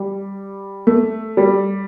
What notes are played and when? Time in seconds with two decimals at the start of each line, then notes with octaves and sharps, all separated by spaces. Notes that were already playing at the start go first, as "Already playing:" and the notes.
Already playing: G3
0.87 A3
1.37 G3